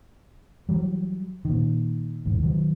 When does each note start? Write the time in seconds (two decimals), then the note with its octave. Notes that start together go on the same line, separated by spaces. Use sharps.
0.69 E3 F#3 G3
1.45 A#2 D#3
2.25 E1 D#2 G#2
2.43 D#3 F#3